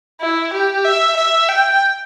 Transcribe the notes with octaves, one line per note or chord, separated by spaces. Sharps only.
E4
G4
E5
E5
G5